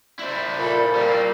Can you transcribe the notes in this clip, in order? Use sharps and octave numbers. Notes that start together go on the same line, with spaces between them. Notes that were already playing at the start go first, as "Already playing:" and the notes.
E4 C5 D5
A#2 A4 B5
G3 A#3 C4